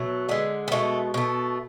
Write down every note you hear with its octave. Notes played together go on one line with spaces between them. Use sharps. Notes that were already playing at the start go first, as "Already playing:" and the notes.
Already playing: B2 F#3 A3
D3 G#3 B3
B3
B2 G#3 A3
B2 A3